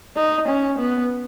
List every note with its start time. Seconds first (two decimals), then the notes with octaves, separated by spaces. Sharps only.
0.17 D#4
0.49 C#4
0.79 B3